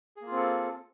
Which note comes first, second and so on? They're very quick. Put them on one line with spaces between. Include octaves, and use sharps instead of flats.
G#4 A#3 F4 C4 A4